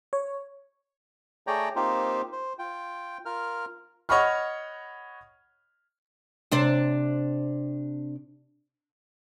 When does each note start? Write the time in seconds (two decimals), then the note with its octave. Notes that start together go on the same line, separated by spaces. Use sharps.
0.13 C#5
1.47 A3 G#4 C#5 D5 G5 A#5
1.76 A#3 C4 D#4 F4 G4 C5
2.32 C5
2.59 F4 G5
3.25 F4 A#4 F6
4.09 C#5 D#5 F#5 B5 C#6 F6
6.51 C3 D4 C5